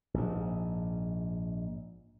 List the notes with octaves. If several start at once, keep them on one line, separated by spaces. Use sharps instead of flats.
A#1 G#2